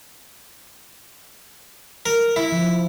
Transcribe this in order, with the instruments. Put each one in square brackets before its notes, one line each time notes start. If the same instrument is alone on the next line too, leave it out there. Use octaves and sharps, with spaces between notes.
[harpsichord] A#4
E4
[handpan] F3